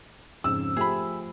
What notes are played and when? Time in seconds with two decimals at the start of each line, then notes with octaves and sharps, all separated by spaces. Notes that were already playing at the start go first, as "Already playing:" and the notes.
0.44 F2 G#2 C#3 E6
0.76 F3 A3 G4 G#4 B5